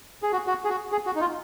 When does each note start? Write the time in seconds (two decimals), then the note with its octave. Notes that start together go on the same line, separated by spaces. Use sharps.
0.23 G#4
0.32 F#4
0.47 F#4
0.65 G#4
0.69 F#4
0.92 G#4
1.06 F#4
1.16 D#4
1.21 F4